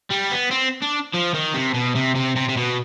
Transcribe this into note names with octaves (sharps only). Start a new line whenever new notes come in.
G3
B3
C4
D4
F3
D#3
C3
B2
C3
C3
C3
C3
B2